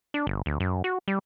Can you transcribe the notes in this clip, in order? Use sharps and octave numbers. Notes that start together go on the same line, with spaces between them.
D4
G1
D2
F#2
F#4
G3